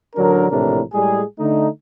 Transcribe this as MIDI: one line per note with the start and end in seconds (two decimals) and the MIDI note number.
0.16 0.49 33
0.16 0.49 50
0.16 0.49 54
0.16 0.49 62
0.16 0.49 70
0.50 0.80 34
0.50 0.80 45
0.50 0.80 48
0.50 0.80 52
0.50 0.80 62
0.50 0.80 70
0.93 1.22 45
0.93 1.22 55
0.93 1.22 56
0.93 1.22 68
1.39 1.67 50
1.39 1.67 57
1.39 1.67 63